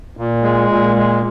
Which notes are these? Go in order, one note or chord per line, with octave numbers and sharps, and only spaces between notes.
A#2
G#3
A#2
G#3